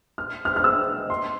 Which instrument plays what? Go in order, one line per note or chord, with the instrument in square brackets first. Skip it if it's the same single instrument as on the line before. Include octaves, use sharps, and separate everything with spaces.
[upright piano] F6
F6
F6
E6
C6